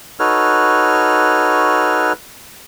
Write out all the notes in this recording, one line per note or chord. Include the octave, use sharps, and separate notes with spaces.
D#4 F#4 A4 B4 C#5 F6